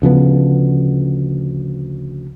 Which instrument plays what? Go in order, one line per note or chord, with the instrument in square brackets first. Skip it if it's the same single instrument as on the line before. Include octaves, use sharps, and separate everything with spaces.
[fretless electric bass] D2 C#3 F3 B3